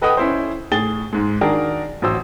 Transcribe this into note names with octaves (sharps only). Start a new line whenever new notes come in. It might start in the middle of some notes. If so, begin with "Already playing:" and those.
A4 B4 D#5 F#5 G5 D#6
C#4 E4 C5
A2 G#4 A6 G7
G#2 G#3
D#3 D4 F#4 G#4 A#4
A1 F#3 C5 E6